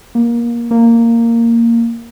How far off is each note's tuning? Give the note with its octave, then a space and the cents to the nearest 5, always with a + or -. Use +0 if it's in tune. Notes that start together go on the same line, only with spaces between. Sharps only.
A#3 +20
A#3 -10